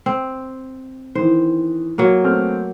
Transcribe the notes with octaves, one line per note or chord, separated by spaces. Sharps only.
C4
D#3 E3 C5
F#3 A#3
A3 C4 F6